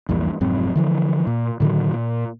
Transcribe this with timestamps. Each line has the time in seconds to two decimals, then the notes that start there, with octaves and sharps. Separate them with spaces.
0.09 A#1 E2 G2 A#2
0.41 F1 G#2 F#3 C4
0.75 D3 E3 F3
1.27 A#2
1.60 A2 D3 D#3 F#3
1.92 A#2